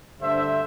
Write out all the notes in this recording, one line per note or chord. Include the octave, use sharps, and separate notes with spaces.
G2 D3 A3 D4 C5 E5